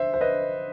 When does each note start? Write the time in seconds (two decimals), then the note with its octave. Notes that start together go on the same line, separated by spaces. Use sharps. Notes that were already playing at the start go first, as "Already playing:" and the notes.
Already playing: C5 E5
0.14 C5
0.21 B4 D#5